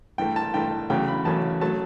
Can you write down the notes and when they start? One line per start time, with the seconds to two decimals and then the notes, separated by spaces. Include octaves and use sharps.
0.18 G2 E3 A3 G5
0.36 A5
0.54 G2 E3 A3 G5
0.90 E2 C#3 F#3 A3 G5
1.08 B5
1.25 E2 C#3 F#3 A3 A5
1.61 F#3 A3 A5